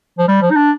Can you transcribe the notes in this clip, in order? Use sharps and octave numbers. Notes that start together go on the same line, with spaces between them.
F3
G3
F3
D#4
D4